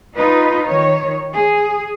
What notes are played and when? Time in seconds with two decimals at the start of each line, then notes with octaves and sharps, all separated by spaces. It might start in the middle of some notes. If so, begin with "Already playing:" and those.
0.16 D#4 F4 B4
0.67 D#3 C#5
1.34 G#4